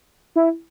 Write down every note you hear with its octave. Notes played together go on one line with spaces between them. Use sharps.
E4